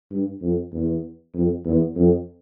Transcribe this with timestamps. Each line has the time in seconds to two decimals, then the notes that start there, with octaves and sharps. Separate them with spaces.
0.11 G2
0.42 F2
0.73 E2
1.35 F2
1.66 E2
1.96 F2